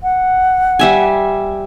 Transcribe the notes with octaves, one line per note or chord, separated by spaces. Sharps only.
F#5
G3 E5 G#5